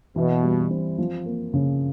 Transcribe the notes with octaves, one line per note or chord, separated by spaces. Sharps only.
B2 E3
G3
C4
F3
A#3
C#3